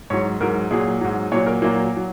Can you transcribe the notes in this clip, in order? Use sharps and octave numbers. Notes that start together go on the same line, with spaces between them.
G#2 F#3 C#5
G#2 F#3 A#4
A#2 F#3 G#4
G#2 F#3
A#2 F#3 C#5
A#4
A#2 F#3 A#3
F#3